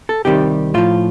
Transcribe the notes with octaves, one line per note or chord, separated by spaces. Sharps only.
A4
C2 C3 D#3 G3 G4
A2 F3 F4